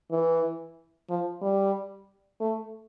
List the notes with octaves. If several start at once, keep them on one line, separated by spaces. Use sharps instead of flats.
E3
F3
G3
A3